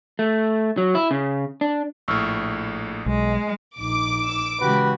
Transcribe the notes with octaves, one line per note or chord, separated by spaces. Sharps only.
A3
F#3
E4
C#3
D4
A#1 A2 C#6 E6 F6
B1 G#3
A#1 D#4 D6
E6
C#3 E3 G#3 F#4 G4 B4